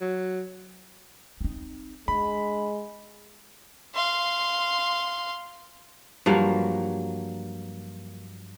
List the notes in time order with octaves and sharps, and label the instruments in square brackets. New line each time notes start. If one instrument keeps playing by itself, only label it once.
[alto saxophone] F#3
[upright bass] C4 D#4
[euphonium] G#3 [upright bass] D4 [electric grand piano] B5
[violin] F5 C6
[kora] G2 F3 F#3 A#3